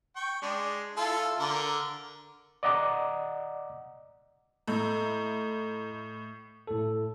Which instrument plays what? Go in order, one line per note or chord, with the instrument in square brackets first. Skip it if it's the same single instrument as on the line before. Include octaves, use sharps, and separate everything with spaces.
[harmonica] G5 C#6
G#3 D4
E4 F4 A4
D3 A#4
[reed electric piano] D5 D#5 F#5 A#5 D6
[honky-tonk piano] A2 [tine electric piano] A4 D#5 A#5
[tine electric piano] A2 A4